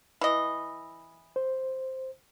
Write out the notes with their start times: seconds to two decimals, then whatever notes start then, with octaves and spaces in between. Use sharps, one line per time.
0.21 E3 D#5
1.36 C5